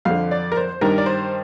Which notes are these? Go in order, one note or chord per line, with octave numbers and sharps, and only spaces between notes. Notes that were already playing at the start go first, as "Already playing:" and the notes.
F2 D3 F5
D5
A#4
C5
G2 D#3 A#4
D5
C5